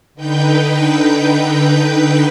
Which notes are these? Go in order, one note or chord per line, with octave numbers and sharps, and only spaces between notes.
D3 D#4 B4 G5 G6